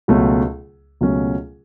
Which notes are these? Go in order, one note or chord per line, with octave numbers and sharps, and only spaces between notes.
C#2 B2 F#3 A3 C#4
C#2 B2 F#3 A3 C#4